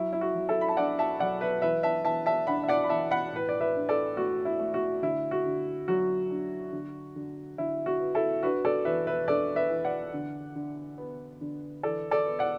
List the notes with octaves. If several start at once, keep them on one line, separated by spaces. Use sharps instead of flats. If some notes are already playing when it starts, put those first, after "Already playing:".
Already playing: F#3 E4
E4
F#4
F#3
E4 A4
B5
A5
D4 D5 F#5
E5 A5
F#3 D5 F#5
B4 E5
E3 B4 E5
E5 A5
E3 E5 A5
E5 A5
D4 F#5 B5
E5
D5 F#5
B5
E3 E5 A5
F#5 B5
A2 B4
D5
B4 E5
D4
A4 D5
A3 F#4
E4
A3
F#4
D3 E4
F#4
D3
F#3 F#4
D4
D3
D3
D3 E4
F#4
B3
E4 A4
D4 F#4 B4
A4 D5
E3 B4 E5
B4 E5
D4 A4 D5
B4 E5
E3
D5 F#5
D3
D3
B3
D3
E3 A4 D5
A4 D5
B3
D5 F#5